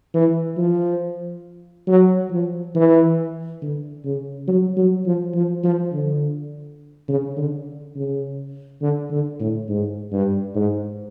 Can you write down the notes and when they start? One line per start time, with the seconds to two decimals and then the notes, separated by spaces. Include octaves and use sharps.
0.14 E3
0.58 F3
1.87 F#3
2.31 F3
2.75 E3
3.62 D3
4.04 C#3
4.48 F#3
4.77 F#3
5.06 F3
5.35 F3
5.64 F3
5.92 D3
7.09 C#3
7.37 D3
7.96 C#3
8.82 D3
9.11 D3
9.40 A2
9.69 G#2
10.12 G2
10.55 G#2